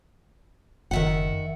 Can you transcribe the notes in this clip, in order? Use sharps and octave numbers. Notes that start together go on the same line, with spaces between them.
F#1 D#3 E5 F#5